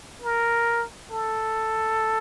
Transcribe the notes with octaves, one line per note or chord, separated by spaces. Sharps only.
A#4
A4